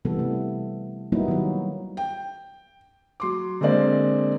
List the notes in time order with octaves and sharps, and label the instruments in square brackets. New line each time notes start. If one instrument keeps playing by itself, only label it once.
[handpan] C3 E3 G3 B3 A4
A3
F#3 G3 A#3 B3 D#4 E4
D#3 F#3
[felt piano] G5
F#3 C6 D6
D3 G#3 A#3 C4 D5